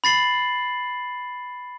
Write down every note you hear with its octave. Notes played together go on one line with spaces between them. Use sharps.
B5 A6 C7 F#7